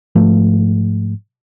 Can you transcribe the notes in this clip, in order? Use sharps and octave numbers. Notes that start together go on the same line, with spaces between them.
G#2 F3 A3